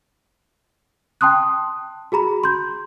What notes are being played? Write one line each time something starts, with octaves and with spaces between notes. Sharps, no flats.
G5 A5 C6 D#6 F#6
F#4 G#4 A#5 B5
C6 G6